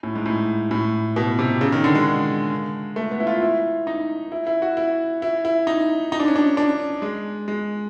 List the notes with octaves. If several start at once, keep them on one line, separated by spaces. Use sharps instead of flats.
A2
G#2
A2
A2
B2
C3
C#3
D#3
D3
G#3
A3
B3
E4
F4
E4
D#4
E4
E4
F#4
E4
E4
E4
D#4
D#4
D4
C#4
D4
D4
G#3
G#3